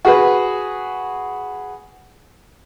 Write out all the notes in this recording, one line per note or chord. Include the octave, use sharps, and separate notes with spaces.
F#4 G#4 B4